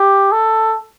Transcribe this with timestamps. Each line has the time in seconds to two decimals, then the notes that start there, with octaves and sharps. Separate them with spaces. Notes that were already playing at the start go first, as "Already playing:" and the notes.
Already playing: G4
0.32 A4